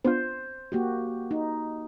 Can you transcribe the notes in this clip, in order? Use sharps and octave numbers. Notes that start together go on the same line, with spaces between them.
B3 D4 F4 C5
A#3 F#4 G4
D#4